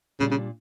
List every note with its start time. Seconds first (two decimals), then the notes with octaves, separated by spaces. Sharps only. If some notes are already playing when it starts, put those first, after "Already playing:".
0.20 A#2 C#3 G3 D4
0.31 C#3